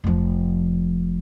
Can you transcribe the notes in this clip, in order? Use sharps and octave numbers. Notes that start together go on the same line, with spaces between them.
F1 F3